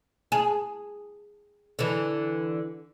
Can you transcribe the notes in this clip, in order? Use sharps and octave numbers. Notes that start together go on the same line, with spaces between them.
G#4
D3 E3